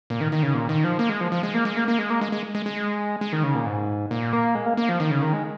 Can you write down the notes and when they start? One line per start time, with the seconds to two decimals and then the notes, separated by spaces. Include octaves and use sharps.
0.10 A#2
0.21 D#3
0.32 D#3
0.43 C#3
0.54 A#2
0.69 D#3
0.84 F3
0.99 A#3
1.10 G#3
1.21 F3
1.32 F3
1.43 G#3
1.54 A#3
1.65 G#3
1.77 A#3
1.88 A#3
1.99 G#3
2.10 A#3
2.21 G#3
2.32 G#3
2.55 G#3
2.66 G#3
3.21 G#3
3.33 D#3
3.43 C#3
3.55 A#2
3.66 G#2
4.11 A#2
4.33 A#3
4.55 G#3
4.66 A#3
4.77 A#3
4.89 F3
5.00 D#3
5.11 C#3
5.22 D#3
5.33 G#3